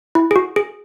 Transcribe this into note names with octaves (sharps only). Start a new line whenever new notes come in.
E4
G#4
F#4
G#4